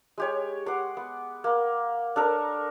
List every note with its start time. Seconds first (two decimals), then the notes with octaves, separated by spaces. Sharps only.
0.18 G#3 G4 C#5
0.66 F#5 C6 D6
0.97 B3
1.44 A#3
2.16 D4 A4 A#4